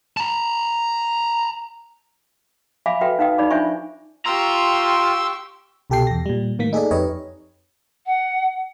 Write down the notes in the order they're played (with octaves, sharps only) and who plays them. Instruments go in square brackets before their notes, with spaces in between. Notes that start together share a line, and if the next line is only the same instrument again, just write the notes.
[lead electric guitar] A5 A#5
[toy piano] E5 F5 G#5 B5 D6
F#4 A4 B4 E5 G5
D#4 B4 F5 G5 D#6
D#4 D5 B5 D6
D4 F4 C5 E5 G#5 C#6
[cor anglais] F4 [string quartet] G4 C#6 [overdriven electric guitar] A#5 [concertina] C6 E6
[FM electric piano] C2 B2 G4 A4 G5 C7
E2 A#6
A#2 G3
A2 D#3 A#3 B6
D#4 G#4 A4 D5
F2 D#4 G4 B4 C#5 D#5
[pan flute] F#5